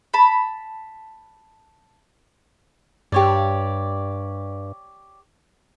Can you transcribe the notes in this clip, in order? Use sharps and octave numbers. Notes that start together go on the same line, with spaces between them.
A5 B5
G2 G4 C#5 D5